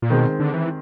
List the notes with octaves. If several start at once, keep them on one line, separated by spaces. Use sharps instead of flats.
A#2
B2 D#3 G#3 C4
D3
E3